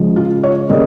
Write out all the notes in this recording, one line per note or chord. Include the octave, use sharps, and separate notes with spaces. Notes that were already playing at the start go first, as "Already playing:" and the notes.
Already playing: C#3 F3 G#3
F4
C#5
C#3 G3 A#3 D#5